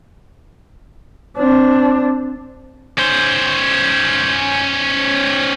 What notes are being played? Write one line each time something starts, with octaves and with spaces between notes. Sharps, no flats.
C4 D4
C#4 C5